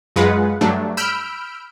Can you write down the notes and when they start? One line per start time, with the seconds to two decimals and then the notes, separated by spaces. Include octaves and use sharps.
0.16 F#2 G#3 F4 B4 F#5
0.61 G2 F#3 A3 D4
0.97 B5 E6 F6 G6 D7